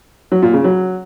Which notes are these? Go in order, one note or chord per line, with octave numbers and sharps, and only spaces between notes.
F#3
A#2
C#3
F#3